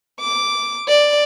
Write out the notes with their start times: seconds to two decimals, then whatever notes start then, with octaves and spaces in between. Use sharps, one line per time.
0.20 D6
0.88 D5